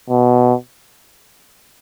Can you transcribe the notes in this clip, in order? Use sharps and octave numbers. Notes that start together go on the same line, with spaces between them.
B2